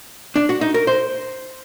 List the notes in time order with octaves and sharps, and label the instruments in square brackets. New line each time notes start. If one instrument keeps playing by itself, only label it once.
[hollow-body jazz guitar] D4
F#4
D#4
A#4
C5